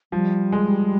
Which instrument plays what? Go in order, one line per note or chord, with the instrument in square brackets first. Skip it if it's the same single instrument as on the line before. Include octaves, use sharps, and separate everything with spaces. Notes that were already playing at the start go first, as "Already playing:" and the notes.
[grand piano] F3 [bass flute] G3
[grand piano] G#3